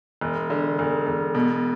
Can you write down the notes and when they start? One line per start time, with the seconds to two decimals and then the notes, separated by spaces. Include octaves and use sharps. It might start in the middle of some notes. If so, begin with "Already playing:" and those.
0.21 E1
0.50 D3
0.79 E1
1.06 E1
1.35 B2